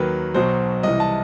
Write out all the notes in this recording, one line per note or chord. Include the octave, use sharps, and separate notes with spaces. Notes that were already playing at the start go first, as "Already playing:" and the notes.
Already playing: D#2 D#3 F#3 B4
B1 B2 F#3 C5
C2 C3 E3 D#5
A5